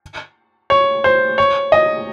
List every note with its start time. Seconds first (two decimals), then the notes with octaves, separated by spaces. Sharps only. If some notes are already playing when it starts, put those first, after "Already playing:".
0.70 C#5
1.04 C5
1.38 C#5
1.72 D#5